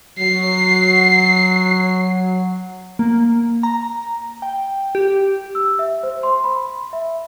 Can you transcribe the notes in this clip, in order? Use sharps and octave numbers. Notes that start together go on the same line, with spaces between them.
F#3 C7
A#3
A#5
G5
G4
E6
E5
C5
C6
B5
E5